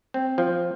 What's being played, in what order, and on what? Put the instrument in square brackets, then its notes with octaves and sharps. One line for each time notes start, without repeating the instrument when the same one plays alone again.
[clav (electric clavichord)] C4
F3